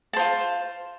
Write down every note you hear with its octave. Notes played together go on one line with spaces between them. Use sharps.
F4 C5 A5